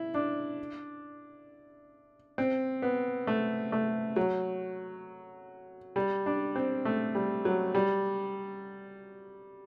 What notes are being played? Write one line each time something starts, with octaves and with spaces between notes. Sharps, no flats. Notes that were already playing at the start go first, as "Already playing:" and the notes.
Already playing: E4
D4
C4
B3
A3
A3
F#3
G3
D4
C4
A3
G3
F#3
G3